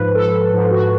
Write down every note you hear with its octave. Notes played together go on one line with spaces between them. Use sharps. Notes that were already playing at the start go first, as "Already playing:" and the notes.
Already playing: G#2 F3 B4
A4
G#2 F3
F#4